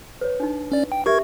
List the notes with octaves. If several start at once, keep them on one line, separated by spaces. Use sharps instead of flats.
B4 C#5
D4 D#4
C#4 D5
G5
G4 A#4 E5 C#6 G#6